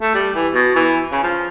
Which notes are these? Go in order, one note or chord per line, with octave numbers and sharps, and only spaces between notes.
A3
G3
E3
B2
E3
C#3
F3